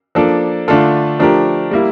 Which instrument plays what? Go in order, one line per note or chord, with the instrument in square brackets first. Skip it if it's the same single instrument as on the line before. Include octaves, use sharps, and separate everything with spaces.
[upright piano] F3 A#3 D4 A4
D3 A3 D4 F4 A4
F3 A3 D4 G4 A#4
G3 A#3 E4